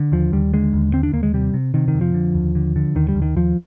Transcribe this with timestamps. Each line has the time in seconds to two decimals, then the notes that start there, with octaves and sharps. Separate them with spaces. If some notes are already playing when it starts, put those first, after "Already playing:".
Already playing: D3
0.12 D#2 F3
0.32 D#2 G3
0.53 D3 G#3
0.74 D#2
0.93 D3 C4
1.03 D4
1.13 D#2 A#3
1.23 G#3
1.34 C3 G3
1.54 C3
1.74 C3 D#3
1.88 D#3
1.94 F2
2.01 F3
2.14 D3
2.34 D#2
2.55 D3
2.76 D3
2.95 D#2 D#3
3.08 G3
3.15 D#2
3.22 D#3
3.36 D#2 F3